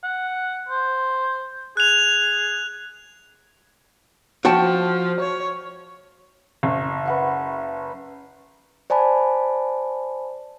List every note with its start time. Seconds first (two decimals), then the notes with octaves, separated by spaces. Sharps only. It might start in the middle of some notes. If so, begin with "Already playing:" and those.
0.04 F#5
0.69 C5
1.77 G#4 F#6 F7
4.45 F3 F#4 G5 A5
5.20 C#5
6.63 F#1
7.05 B4 F#5 C#6
8.90 C5 D5 G#5 A5 B5